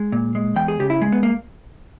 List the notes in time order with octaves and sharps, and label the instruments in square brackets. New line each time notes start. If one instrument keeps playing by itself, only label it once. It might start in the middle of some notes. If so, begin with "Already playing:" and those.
Already playing: [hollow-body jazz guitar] G#3
A#2
G#3
E2 G5
G#4
C#3 G4
E4
G#3
B3
A#3